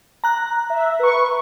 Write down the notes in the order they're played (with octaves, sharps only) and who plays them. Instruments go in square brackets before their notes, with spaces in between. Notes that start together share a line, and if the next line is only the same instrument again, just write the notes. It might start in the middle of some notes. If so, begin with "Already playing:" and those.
[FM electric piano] A#5 F#6
[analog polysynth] E5
B4 C#6